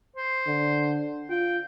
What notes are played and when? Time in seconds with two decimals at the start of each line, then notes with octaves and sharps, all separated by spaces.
0.16 C5
0.48 D3
1.30 F4 G5